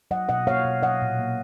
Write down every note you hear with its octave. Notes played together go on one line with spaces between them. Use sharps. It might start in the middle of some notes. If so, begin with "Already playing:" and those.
F#3 D#5 F#5
B2 D#5 F#5
A#3 C#5 F5
B2
F#3 D#5 F#5
A#2
A#3